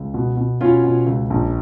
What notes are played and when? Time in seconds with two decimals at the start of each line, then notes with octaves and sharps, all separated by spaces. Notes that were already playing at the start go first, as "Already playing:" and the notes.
Already playing: C#2
0.14 B2
0.37 B2
0.61 B2 C#4 F4
0.84 B2
1.07 C#2
1.30 A#1